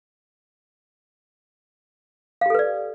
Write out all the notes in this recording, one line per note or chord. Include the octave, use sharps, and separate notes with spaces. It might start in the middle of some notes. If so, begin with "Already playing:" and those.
G4 A4 B4 D5 F5